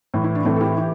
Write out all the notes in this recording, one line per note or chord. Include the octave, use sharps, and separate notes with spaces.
A2 E3
E4
D4
A2 E3 A3 C4
A4
E4 G4
E3